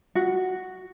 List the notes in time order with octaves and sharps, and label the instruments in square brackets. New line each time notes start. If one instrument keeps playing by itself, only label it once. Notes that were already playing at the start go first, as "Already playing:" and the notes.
[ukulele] F#4